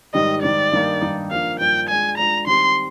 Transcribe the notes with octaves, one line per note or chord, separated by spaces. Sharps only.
G#2 D#3 G3 D#5
G#2 D#3 G3 D5
G2 D#3 A#3 D#4
G2 D#3 A#3 D#4
G2 F3 A#3 D4 F5
G2 F3 A#3 D4 G5
G#3 D4 F4 G#5
G#3 D4 F4 A#5
D#3 G3 C4 C6